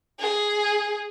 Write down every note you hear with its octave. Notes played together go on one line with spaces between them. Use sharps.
G#4